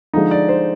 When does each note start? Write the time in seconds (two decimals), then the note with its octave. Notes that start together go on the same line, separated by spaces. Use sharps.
0.14 D3 F3 G#3 D#4
0.31 D5
0.49 C5